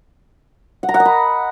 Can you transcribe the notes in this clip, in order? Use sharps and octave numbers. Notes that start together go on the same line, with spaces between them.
F#5
A#5
F#5
D#5
B5